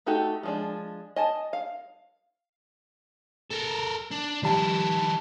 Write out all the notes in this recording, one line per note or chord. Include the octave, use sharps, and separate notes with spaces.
A3 D#4 F#4 G4 A4
F3 G#3 D4
D#5 G#5 A5
F5
A4 A#4
D4
D#3 G3 E4 A5